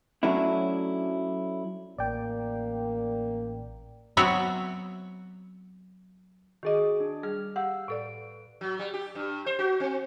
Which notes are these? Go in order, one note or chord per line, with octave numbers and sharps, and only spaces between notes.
F#3 A3 C#4 D4 E4
A1 A#3 D5 G5
F#3 B3 C4 F#4 C#5 E5
D#3 F#4 G#4 D#5 D6
D4
G3 G#4 F6
G4 F5 F#5 E6
A2 A4 B4 D5 D7
F#3
G3
G4
G2
C5
F#4
C4